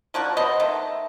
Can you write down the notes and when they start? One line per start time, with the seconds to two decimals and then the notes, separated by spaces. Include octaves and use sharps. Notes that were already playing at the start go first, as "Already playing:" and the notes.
0.14 F3 A#3 D4 F#4
0.37 B3 C5 D#5
0.60 D#3 A3